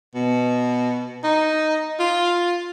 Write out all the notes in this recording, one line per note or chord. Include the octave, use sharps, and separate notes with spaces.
B2
D#4
F4